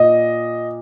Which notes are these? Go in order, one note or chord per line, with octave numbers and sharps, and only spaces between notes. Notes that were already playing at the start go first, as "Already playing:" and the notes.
Already playing: A#2 D#5